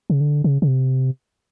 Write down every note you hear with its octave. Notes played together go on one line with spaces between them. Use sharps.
C#3
D3
C#3
C#3
C3